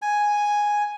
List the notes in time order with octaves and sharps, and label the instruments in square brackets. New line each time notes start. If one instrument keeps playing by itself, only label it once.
[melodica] G#5